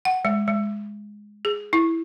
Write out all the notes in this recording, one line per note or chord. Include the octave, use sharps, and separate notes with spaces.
F#5
G#3
G#3
G#4
E4